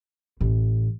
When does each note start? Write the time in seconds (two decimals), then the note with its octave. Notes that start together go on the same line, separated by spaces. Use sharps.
0.41 A1